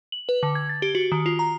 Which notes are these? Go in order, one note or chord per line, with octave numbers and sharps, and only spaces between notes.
F#7
B4
D3
G#6
A6
G4
F#4
D#3
F4
A#5